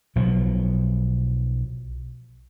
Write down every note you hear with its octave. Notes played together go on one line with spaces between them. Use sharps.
B1 B2 F3 F#3